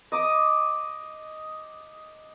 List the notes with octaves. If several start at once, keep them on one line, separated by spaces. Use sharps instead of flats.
D#5 D6 D#6